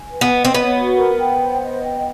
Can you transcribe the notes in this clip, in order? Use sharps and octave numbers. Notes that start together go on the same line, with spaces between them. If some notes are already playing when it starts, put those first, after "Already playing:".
Already playing: G#5
B4
B3
D#5
C4
B3 C#5
F#4
A#4
G5
C5
D#5
G5